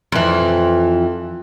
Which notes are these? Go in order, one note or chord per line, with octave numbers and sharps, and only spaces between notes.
F2 E3